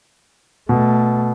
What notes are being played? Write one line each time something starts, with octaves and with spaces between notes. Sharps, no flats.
B2 A3